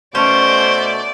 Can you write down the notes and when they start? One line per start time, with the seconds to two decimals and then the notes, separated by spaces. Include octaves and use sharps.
0.15 B2 A3 C#4 C5 D5